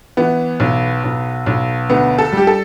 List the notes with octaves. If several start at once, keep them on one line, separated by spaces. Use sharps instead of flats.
E3 B3
B1
B1
B1
D2 B3
A4
G3 G4
A4